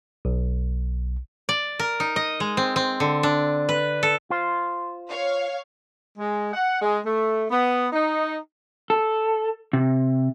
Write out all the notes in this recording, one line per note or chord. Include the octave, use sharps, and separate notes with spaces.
B1
D5
A#4
D#4
D#5
G#3
C4
C4
D3
D4
B4
A4
F4 C5
C#5 F5
G#3
F#5
G#3
A3
B3
D#4
A4
C3